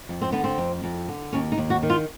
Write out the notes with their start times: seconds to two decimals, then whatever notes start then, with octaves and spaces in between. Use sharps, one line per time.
0.09 F2
0.22 C4
0.32 D3 B3
0.44 C4
0.58 F2
0.84 F2
1.08 D3
1.33 D#2 C#4
1.52 D#4
1.58 D#2
1.70 F#4
1.83 D#3
1.90 F4